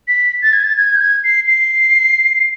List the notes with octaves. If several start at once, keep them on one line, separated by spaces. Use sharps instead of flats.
B6
A6
G#6
A6
G#6
G6
G#6
C7
C7